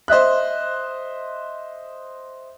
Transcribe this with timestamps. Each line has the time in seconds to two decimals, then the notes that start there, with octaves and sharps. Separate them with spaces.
0.08 C5 D#5 E5 F#6